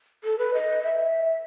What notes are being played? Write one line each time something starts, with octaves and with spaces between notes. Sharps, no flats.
A4
B4
D#5
E5